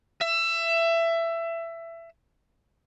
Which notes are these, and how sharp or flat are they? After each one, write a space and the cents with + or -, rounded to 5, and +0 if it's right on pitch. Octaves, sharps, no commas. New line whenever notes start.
E5 +20